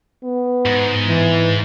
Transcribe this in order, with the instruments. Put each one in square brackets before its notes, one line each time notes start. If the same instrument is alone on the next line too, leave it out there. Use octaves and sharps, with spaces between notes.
[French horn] B3
[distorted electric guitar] G#2
[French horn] E3